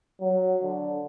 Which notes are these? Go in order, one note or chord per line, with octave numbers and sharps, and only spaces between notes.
F#3
D3